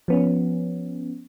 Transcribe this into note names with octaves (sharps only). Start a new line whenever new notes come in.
F3 B3 C#4